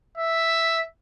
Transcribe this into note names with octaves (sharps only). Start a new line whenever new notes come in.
E5